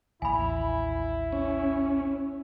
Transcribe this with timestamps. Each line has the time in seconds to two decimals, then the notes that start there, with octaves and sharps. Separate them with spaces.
0.22 A1 D#2 E4 G#5 B5
1.32 C#4